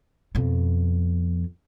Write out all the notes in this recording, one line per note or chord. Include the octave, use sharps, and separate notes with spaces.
F2 B2